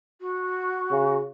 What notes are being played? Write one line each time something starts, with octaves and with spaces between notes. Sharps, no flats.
F#4
C#3